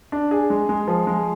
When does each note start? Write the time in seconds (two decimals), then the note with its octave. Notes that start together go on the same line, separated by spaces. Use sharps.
0.12 D4
0.31 G#4
0.50 G#3
0.69 G#3
0.88 F3
1.07 G#3